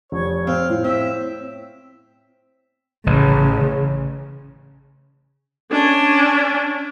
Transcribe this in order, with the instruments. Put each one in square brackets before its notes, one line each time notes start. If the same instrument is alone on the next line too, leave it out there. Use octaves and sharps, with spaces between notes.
[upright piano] F1 [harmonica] C#5
[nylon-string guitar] C4 [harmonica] F5
[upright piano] A2
[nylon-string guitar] C4 [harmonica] E5
[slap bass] A1 [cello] C#3
[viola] C#4 D4